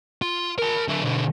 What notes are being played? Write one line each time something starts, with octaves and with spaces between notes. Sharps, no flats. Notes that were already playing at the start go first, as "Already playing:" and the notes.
F4
A#4 A5
D3 E4
B2 D3